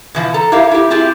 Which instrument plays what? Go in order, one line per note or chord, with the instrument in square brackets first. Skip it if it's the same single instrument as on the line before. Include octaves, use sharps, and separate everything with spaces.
[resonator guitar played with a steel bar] B2 E3 F3
A4 A#5
E4 G4 A#4 E5 F5
E4 G4
C4 E4 F4 G4 G#4